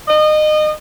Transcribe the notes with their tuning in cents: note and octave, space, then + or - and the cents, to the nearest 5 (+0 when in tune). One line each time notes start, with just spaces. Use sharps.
D#5 -25